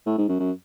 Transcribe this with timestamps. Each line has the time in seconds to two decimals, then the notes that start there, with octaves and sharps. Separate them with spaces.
0.06 A2
0.18 G#2
0.29 F#2
0.40 F#2